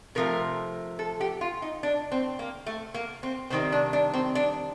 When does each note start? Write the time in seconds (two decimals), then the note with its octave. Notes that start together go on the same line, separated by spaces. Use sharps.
0.15 C3 F3 A3 A#4
0.99 A4
1.21 G4
1.41 F4
1.62 D#4
1.83 D4
2.12 C4
2.39 A#3
2.66 A3
2.94 A#3
3.23 C4
3.50 C3 D#3 G3 C4
3.72 D4
3.93 D4
4.13 C4
4.35 D4